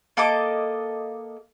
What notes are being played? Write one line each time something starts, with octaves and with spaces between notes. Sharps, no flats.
A#3 A4 D#5 D6